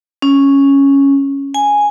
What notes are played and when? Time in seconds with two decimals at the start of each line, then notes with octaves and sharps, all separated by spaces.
0.22 C#4
1.54 G#5